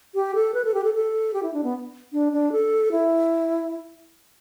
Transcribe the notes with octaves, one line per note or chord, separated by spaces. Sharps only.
G4
A4
B4
A4
G4
A4
A4
G4
E4
D4
B3
D4
D4
A4
E4